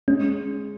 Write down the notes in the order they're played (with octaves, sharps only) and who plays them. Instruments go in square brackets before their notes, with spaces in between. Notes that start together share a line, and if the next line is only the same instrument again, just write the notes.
[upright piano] G#3 [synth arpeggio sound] C#4